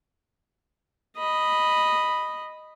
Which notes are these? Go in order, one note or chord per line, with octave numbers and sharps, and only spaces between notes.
D#5 B5